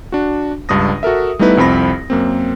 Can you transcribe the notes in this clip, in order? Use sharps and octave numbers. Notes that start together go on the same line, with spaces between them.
D4 F#4
C#2 G2 D4 D#6 A#6
F#4 A4 A#4 E5
G3 A3 B3 D#4 E4 B4
C2 F2 C4 B5 A#6
F#2 A#3 C4